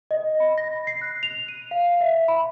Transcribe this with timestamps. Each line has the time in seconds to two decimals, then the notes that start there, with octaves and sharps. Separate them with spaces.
0.11 D#5
0.40 B5
0.58 A#6
0.87 C7
1.02 F#6
1.23 F7
1.48 D#7
1.71 F5
2.01 E5
2.28 B5